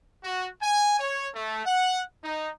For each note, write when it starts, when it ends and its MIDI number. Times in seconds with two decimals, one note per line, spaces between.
0.24 0.49 66
0.62 0.97 80
1.00 1.29 73
1.34 1.63 57
1.66 2.02 78
2.24 2.50 63